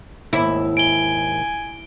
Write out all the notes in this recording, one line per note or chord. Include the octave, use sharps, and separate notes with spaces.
D#2 G#2 E4
G#5 D7 G7